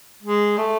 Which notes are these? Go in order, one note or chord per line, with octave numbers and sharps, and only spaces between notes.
G#3
A3